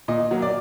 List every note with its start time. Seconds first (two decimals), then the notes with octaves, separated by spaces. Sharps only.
0.08 A#2 D#5
0.31 F#3 A#3
0.42 D5